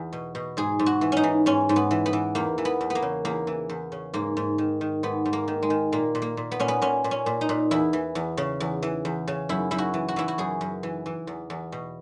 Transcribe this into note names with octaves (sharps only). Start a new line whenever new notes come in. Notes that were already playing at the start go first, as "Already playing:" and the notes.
Already playing: E2
B2
B2
G#2 G#4
G#2
F#4
E3
C#4 D#4
E3
G#2 C#4
G#2
B3
E3
B3
E3
E2 A#3
E3
B3
E2
B3
A#3
C#3
E2 A#3
E3
E2
C#3
G#2 A#3
G#2
D#3
D#3
G#2 B3
G#2
A#3
D#3
G#3
D#3
A#2 A#3
A#2
A#3
A#2
B3
A#2 C#4
B3
A#2 C#4
A#2
C#4
A#2
D#4
A#2
E2 E4
E3
E2
C#3
E2
E3
E2
C#3
F#2 E4
F#2 E4
F#4
E3
F#4
E3 E4
F#4
F#2 G#4
F#2
E3
E3
E2
E2
B2